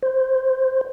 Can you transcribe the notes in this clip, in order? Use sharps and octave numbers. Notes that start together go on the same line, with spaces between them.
C5